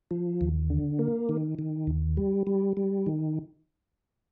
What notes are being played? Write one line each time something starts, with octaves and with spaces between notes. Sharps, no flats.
F3
D#2
D3
A#3
D#3
D#3
D#2
G3
G3
G3
D#3